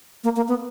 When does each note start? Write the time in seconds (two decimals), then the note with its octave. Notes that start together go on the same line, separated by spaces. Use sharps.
0.24 A#3
0.36 A#3
0.48 B3